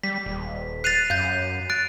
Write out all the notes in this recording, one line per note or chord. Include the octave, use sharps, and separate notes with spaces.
G3 B6
D#1
F#6 A6 C7 D#7 F7
F#2 F5 G6
F#6 A6 D7